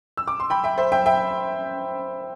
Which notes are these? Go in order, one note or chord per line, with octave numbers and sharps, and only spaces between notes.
E6
D6
C6
G5 B5
E5 G5
C5 E5
E5 G5
E5 G5